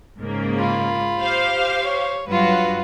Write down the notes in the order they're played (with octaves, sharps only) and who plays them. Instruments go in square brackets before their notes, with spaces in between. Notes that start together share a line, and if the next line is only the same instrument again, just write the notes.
[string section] G#2 C#3 A#3
[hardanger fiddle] F4 B5
[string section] G4 C5 F5
[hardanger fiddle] C#5
[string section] G2 F#3 F#4 [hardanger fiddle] F4 B4